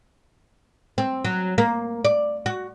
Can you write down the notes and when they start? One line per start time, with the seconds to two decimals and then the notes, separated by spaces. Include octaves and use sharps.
0.98 C4
1.25 F#3
1.58 A#3
2.04 D5
2.46 F#4